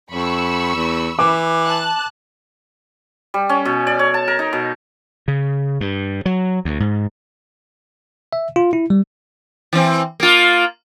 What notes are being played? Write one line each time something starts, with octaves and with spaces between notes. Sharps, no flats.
F2 B5 C#6 E6
E2
E3 D6
A5 F#6
G3
C#4
B2
D5
C#5
A5
A#4
D#4
B2
C#3
G2
F#3
D2
G#2
E5
F4
E4
G3
E3 C4
A#3 F4